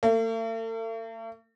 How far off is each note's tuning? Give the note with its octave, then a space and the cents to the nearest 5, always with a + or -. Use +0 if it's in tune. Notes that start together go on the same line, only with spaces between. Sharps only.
A3 +45